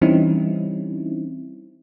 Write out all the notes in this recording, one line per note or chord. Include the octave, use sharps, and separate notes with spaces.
E3 G3 C4 C#4 D#4 E4